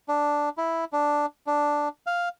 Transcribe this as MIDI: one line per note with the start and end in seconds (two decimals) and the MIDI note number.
0.08 0.49 62
0.57 0.85 64
0.93 1.26 62
1.47 1.88 62
2.07 2.29 77